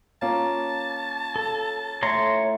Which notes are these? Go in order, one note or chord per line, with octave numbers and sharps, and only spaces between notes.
A#3 C#4 F4 A5
A4
A2 C#5 A#5 C6